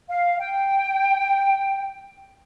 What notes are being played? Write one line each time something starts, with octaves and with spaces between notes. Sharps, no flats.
F5
G5